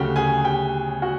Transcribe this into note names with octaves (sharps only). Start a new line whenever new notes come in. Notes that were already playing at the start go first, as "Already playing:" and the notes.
Already playing: D2 C#3 F#3 A3 F#4 G4 G5
G#4 G#5
G4 G5
F#4 F#5